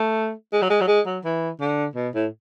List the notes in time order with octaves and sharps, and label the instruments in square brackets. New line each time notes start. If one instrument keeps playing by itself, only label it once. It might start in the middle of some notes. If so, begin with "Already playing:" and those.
Already playing: [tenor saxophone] A3
G#3
F#3
G#3
F#3
G#3
F#3
E3
D3
B2
A2